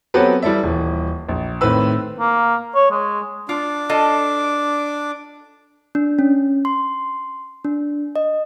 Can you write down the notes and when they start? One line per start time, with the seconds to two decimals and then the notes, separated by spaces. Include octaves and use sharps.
0.14 F#3 B3 C4 G4 A4 B4
0.43 G3 E4 A4 D5 E5
0.63 D#1 E3
1.28 A#1
1.61 A2 D#3 C4 B4 E6
2.19 A#3
2.75 C#5
2.91 G#3
3.49 D4 F4 D6
3.89 F4 A4 D#5
5.95 D4
6.19 C#4
6.65 C6
7.64 D4
8.16 D#5